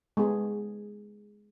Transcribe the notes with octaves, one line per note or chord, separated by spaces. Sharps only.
G#3 B3 G#4